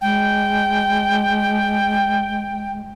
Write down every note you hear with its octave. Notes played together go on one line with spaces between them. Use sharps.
G#3 G5